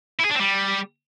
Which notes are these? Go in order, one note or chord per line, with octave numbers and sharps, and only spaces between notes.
E4
G#4
D4
C4
G3